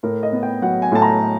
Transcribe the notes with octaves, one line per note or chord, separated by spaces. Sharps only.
A2 A#4
D#5
B3
G5
F#3 F#5
G#5
A2 A5
A#5